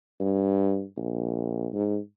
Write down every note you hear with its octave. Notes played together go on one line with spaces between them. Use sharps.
G2
A#1
G#2